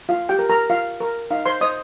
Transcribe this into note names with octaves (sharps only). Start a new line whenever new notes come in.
F4 F5
G4 G5
A#4
A#4 A#5
F4 F5
A#4
D#4 F5
C5 C6
C5 D#5 D#6